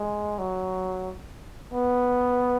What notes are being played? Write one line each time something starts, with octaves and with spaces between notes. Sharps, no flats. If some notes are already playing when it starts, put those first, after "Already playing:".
Already playing: G#3
F#3
B3